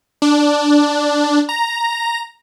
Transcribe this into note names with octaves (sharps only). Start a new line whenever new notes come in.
D4
A#5